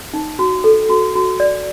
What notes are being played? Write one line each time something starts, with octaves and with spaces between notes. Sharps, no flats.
D#4
F#4
A4
F#4
F#4
D5